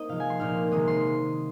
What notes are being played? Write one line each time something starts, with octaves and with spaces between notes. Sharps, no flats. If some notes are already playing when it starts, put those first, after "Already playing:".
Already playing: A#3 C4 D#4 D#5
C3 F3 G#3 F5
G#5
C6
A#2 A#3 D#4 F6
C3 D#3 G#3 D#6
C6